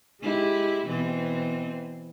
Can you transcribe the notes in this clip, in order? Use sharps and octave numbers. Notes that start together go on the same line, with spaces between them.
G#3 E4 G4
B2 E3 C4